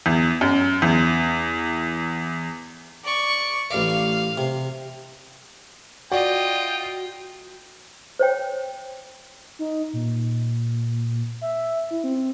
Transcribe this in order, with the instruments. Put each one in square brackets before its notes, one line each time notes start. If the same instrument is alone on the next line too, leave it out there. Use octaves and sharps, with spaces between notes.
[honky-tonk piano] E2
F#2
E2
[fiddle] D5 C#6
[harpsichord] A1 D5 [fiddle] F5
[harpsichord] C3
[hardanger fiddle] F4 D#5 [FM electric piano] F#4 [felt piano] D5 [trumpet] G5
[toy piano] C5 C#5 G5
[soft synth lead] D#4
A#2
E5
E4
C4